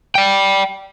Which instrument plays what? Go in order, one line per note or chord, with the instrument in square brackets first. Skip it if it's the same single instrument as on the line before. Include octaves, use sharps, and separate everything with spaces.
[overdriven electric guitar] D5 G5